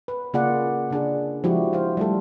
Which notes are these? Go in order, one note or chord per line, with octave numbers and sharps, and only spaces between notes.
B4
C#3 A#3 F4 G#4 D5 F#5
C#3 D4 G#4
F3 G#3 E4 F#4 G4
C5 F5
G3 A3 A4